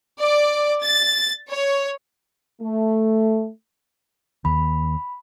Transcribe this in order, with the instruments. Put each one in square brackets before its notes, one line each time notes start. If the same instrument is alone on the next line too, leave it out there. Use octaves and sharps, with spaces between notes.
[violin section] D5
A6
C#5
[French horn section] A3
[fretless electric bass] D#2 [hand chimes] B5